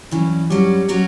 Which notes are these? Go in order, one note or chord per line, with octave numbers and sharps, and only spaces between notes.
G2 E3 F#3 C#4
G2 F#3 G3 C#4
F#3 C#4 F#4 A#4